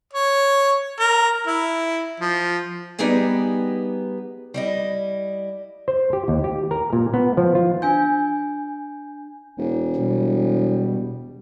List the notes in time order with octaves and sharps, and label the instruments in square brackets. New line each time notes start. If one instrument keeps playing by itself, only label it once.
[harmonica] C#5
A#4
E4
F3
[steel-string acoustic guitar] G3 B3 D#4 G4 G#4 G#5
G3 E4 D#5
[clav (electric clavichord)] C5
G4
D#2
G4
A#4
A#2
B3
F3
F4
[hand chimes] D4 G#5 G6
[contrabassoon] E1
[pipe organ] B2 G3